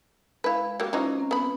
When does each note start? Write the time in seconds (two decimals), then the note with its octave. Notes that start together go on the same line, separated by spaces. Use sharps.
0.44 G#3 E4 B4 F5
0.80 F#3 A#3 G4
0.93 E3 F#3 C#4 D#4 F4 C5
1.19 C4 A#5
1.31 B3 B5